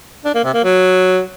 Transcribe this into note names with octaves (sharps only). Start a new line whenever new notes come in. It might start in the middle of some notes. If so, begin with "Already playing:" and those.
D4
A#3
C3
A#3
F#3